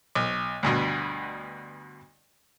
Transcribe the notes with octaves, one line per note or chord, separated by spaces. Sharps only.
B1
D2 G2 B2